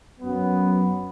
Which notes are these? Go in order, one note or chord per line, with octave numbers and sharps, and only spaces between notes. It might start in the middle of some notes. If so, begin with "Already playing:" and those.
F#2 F#3 B3